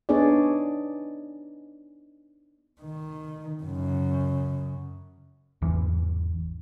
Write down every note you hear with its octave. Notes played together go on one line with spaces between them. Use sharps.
B3 D4 D#4 G#4 C#5 D5
D#3
F#2 C#3
G#1 E2 E3